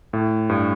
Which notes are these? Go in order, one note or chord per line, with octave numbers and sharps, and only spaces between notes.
A2
G2